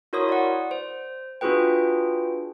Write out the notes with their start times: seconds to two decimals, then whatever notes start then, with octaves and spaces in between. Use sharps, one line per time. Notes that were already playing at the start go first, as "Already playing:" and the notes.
0.13 E4 F#4 A#4 C#5 C6 D#6
0.29 D5 F#5
0.71 C5
1.41 D4 F4 F#4 G#4 B4 G5